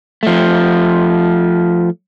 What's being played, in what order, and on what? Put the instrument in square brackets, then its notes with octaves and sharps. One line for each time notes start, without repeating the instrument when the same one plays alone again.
[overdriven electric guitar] F3 A3